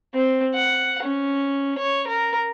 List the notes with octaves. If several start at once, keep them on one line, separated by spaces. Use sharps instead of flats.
C4
F#5
C#4
C#5
A#4